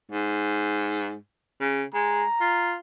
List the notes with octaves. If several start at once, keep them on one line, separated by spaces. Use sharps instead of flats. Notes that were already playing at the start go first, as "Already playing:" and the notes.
G#2
C#3
G#3 A#5
F4